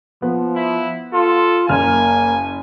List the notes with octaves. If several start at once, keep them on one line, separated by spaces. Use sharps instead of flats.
F3 B3
E4
F4 A4
F#1 A#3 G#5 F6